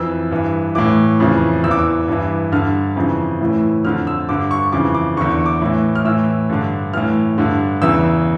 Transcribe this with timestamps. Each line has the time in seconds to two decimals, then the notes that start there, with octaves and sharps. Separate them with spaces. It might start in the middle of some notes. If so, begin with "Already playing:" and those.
Already playing: F2 E3 E6
0.31 G2 E3
0.75 A2 E3 D6
1.20 F2 C#3 E3
1.64 E2 E6
1.68 E3 D6
1.79 E6
2.08 G2 E3
2.52 G2 D3 F6
2.96 F2 C#3 E3
3.41 A2 E3
3.84 F2 D3 F6
4.07 E6
4.29 G2 D3 D6
4.51 C#6
4.72 F2 C#3 E3 D6
4.95 D6
5.17 E2 D3 C#6
5.32 C#6
5.46 D6
5.62 A2 E3
5.95 F6
6.05 A2 E3 E6
6.50 G2 D3
6.94 A2 E3 F6
7.38 G2 D3
7.82 E2 C#3 E3 E6